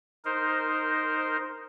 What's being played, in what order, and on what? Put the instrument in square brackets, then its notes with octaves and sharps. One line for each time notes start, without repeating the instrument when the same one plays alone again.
[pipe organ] D#4 A#4 C5